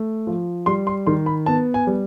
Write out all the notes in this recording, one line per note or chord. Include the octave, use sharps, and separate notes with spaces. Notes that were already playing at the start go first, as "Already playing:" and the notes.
Already playing: A3
F3
G3 C6
C6
D#3 C6
B5
B3 A5
G#5
G3